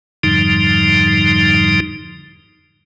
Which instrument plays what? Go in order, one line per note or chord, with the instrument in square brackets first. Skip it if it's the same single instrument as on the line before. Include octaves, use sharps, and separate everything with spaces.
[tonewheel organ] F2 G#2 D3 F3 G3 D#4